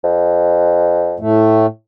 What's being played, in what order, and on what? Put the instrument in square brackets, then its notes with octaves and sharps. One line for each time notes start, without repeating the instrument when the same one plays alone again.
[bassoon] F2
[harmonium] A2 A3